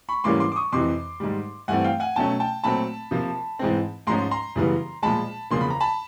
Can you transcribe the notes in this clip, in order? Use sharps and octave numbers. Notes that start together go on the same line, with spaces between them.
B5 C#6
G#2 E3 G3 A#3 C#4 C6 D6
C6 D6
D6
C#6 D#6
F2 C3 E3 C6 D6
G#2 D#3 G3
G2 E3 A3 C4 F#5 G#5
F5 G5
F#5 G#5
B2 F#3 A3 C#4 G5 A5
G5 A5
A#2 F#3 A3 C4 A5 B5
C3 F3 A#3
G#2 E3 G#3 C4
G#2 F3 G#3 C#4 A#5 C6
A#5 C6
F#2 C#3 E3 G3 B3
A#2 F3 G#3 A5 B5
E2 C#3 F3 A#3 C6
B5
A#5
A5 B5